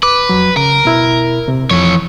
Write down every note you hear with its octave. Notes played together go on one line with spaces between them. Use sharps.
B4 D6
F2 F#3
C#3 A#4
B2 E4
C3
F2 E3 F3 C#5